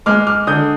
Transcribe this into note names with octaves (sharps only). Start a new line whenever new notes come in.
G#3 D6 F6
D6 F6
D3 D#6 G6